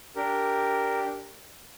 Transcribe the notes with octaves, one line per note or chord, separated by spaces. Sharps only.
D4 G4 A#4